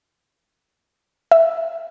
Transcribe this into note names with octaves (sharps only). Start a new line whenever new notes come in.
E5